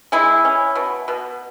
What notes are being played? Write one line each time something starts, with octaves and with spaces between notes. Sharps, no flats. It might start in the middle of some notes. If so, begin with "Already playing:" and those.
G#3 E4
C#4
B2
B2